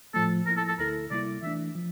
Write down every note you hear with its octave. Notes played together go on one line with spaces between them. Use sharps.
A2 F3 A3 A4
F3 A#3 E4 A#4
A4
A4
D2 D3 A3 E4 A4 A#4
C3 G3 A#3 E4 D5
E3 A3 D4 E5
F3